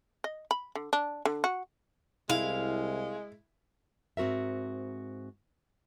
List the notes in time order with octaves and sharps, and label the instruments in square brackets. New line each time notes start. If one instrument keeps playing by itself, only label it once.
[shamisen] D#5
B5
D3
D4
D3
F#4
[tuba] C2 [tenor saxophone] G#3 [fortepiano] E4 [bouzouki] F5
[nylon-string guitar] G#2 C4 F#4 A#4 E5